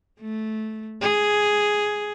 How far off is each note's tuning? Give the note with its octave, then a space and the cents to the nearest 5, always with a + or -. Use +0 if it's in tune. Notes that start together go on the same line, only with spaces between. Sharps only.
A3 -10
G#4 +5